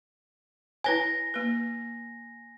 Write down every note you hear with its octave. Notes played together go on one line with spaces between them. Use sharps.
E4 B4 C#5 G#5 A#6
A#3 B4